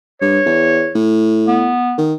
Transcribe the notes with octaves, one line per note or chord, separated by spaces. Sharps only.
G2 C#5
E2
A2
B3
D#3